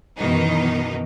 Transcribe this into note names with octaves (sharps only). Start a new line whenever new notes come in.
F#2 B2 D#3 E3 D#4